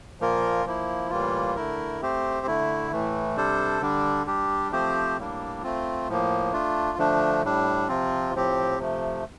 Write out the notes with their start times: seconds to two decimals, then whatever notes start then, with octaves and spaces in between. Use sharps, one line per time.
0.20 A#2 F3 A#3 F4 A#4
0.66 F3 A#3 E4
1.10 A2 E3 G3 A#3 F4
1.56 D3 A3 E4 A#4
2.02 A3 C4 G4 C5
2.47 D3 A3 E4
2.92 A2 E3 A3
3.36 C3 G3 D4 A4 C5
3.81 D3 G3 D4
4.27 G3 D4 G4
4.72 F3 A3 C4 G4 C5
5.17 A2 G3 A#3 D4
5.63 A3 C4 F4
6.08 A2 F3 A#3
6.53 A3 D4 F4
6.98 D3 F3 A3 D4
7.43 A2 G3 D4
7.88 C3 F3 C4 F4
8.34 A2 F3 C4 G4
8.78 C3 F3 A3